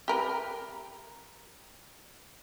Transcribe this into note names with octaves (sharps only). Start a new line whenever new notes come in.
G4 A#4 B4